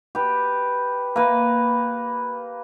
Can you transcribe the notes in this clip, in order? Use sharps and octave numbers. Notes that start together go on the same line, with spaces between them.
G4 B4
A#3 B4